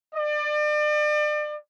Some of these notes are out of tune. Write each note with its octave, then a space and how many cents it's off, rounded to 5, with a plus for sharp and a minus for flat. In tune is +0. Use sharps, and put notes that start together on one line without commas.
D5 +35